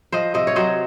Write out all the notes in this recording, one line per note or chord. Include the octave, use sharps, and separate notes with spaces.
F3 C5 D#5
C3 C5 D#5
C#5
F#3 C5 D#5